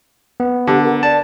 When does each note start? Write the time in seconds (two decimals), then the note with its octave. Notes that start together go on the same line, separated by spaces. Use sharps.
0.40 B3
0.67 D3 G4
0.83 A#4
1.03 D5 A5